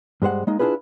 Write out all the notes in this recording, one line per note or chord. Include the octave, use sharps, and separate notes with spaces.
G2 G#3 C5 F#5
G#3 A#3 D#4
D4 E4 F4 G#4 B4